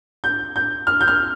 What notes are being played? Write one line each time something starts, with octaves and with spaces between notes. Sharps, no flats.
G6
G6
F6
G6
F6